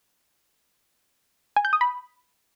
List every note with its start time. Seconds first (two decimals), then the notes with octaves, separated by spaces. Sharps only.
1.56 G#5
1.65 G6
1.73 D#6
1.81 B5